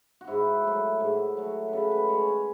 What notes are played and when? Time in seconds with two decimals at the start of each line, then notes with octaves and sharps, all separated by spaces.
0.21 F#4
0.27 G#2 E4
0.64 F#3 A3
1.00 G#2
1.37 F#3 A3
1.68 C#3 A4 B4
1.91 B4
2.09 G#3 C#5
2.28 C#5